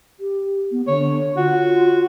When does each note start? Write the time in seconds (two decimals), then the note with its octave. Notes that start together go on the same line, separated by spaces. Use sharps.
0.20 G4
0.71 B3
0.87 D3 C#5
1.36 F4 F#4